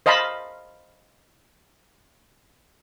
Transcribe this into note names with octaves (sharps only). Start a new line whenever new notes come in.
C5 D#5 F5 A5 B5